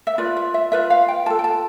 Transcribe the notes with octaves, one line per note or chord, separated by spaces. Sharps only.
E5
F4 B4 D5
E5
E5
F4 B4 E5
F5
G5
F4 A4 A5
G5
A5